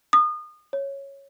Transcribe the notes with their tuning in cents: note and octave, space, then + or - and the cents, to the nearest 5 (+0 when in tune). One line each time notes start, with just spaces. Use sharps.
D#6 -30
C#5 -5